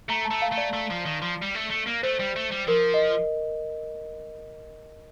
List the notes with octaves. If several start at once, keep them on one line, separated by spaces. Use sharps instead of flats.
A3 A#5
A5
A3
F5
A3
D5
A3
F3
D#3
F3
G3
A3
A3
A#3
A3 C5
G3
A3
G3
F3 A#4
D#5